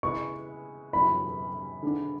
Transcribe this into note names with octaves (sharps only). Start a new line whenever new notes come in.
C#3 G#3 B3 E4 C#6
F#2 C#3 F#3 C#4 E4 B5
D3 G#3 D4